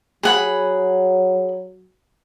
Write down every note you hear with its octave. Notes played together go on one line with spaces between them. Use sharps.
F#3 G#4 F#5 B5